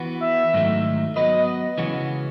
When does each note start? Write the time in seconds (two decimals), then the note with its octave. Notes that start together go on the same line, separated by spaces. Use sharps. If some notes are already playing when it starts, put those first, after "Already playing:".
Already playing: E3 B3 F#4
0.22 E5
0.54 G#2 D#3 F#3 A3 D#4
1.16 F#3 B3 F#4 B4 D#5
1.78 C#3 E3 G#3 C#4 F#4